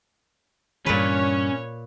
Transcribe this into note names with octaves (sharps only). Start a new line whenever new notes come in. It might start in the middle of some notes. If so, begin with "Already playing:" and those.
G2 A#2 E3 C#4 B4 C#5